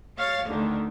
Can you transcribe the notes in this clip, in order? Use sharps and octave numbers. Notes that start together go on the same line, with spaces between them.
C#5 F5 A6
D2 D3 D#3